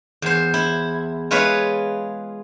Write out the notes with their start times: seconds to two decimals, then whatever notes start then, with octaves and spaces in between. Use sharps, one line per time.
0.22 E2 C5
0.54 E4
1.31 G#3 F4 B4 C#5 E5